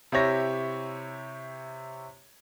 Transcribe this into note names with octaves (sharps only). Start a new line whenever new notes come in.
C3 E4 G4 C#5 A#6